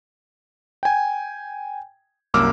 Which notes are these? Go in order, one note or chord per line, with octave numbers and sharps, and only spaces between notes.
G5 G#5
C2 F#2 A#3 D6 E6 F6